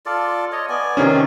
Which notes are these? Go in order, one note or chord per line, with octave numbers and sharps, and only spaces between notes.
F4 A4 D5
C#5 D#5
B3 D5 G#5
C3 D#3 C#4